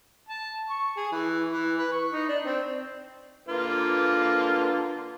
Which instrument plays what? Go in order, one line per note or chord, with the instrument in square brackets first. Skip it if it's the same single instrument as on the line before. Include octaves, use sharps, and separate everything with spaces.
[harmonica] A5
C#6
G#4
E3
E3
B4
C#6
D#4
D4
C4
[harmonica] D3 A#3 F4 [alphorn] B4